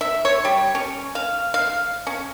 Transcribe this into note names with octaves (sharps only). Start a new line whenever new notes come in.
E5
C#5
G3
C#4
F5
F5
C#4